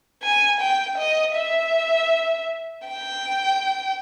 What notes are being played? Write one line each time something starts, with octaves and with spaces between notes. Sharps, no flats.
G#5
G5
D#5
E5
G5